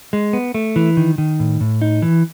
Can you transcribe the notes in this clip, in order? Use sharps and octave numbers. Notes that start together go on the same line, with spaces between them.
G#3
B3
A3
E3
D#3
D#3
A2
A2
D#4
E3